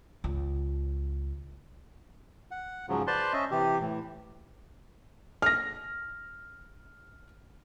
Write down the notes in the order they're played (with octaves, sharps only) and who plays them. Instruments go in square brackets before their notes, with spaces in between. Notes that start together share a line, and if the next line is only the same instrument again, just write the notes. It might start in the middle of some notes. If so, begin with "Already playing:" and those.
[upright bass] C#2
[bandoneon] F#5
G#2 C#3 F3 F#3
B4 C5 D5 A5 C6
C#4 D#5 E5
C3 E3 G4
A2 E3
[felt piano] F6 A#6